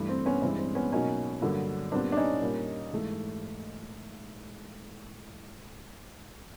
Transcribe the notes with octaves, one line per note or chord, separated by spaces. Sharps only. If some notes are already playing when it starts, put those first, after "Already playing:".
Already playing: G2 E3 A3
C4
B3 C#4
G2 E3 G#3 C4
C4
B3 C#4
B2 F#3 A#3 C#4 D#4
G2 D3 F#3 A#3
A#2 G3 B3 C4 D4
D4
C#4 D#4
A#2 G3 A#3
G#2 E3 A3